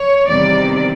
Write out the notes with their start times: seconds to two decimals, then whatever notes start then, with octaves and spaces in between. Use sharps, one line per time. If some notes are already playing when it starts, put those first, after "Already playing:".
Already playing: C#5
0.27 E2 C3 D#3 G3 D5